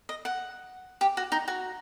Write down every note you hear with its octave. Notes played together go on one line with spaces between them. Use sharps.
D#5
F#5
G4
F#4
D#4
F#4